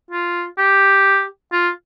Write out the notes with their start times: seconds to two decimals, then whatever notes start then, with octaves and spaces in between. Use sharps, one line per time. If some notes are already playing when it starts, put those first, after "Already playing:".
0.11 F4
0.58 G4
1.52 F4